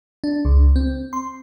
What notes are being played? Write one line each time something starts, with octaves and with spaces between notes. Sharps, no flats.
D4
C#2
C4
C6